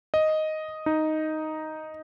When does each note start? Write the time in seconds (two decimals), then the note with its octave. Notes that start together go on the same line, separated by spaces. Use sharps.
0.14 D#5
0.86 D#4